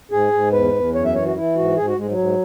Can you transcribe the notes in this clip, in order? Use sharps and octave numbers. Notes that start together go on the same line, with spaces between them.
G#2 G#4
G#2
E2 B4
E2
F#2 C#5
E5
E3 C#5
F#4
E3 E4
G#2 F#4
G#2 G#4
F#4
G#2 G#3
F#3
G#2